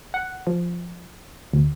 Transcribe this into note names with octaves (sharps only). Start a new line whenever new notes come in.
F#5
F3
D2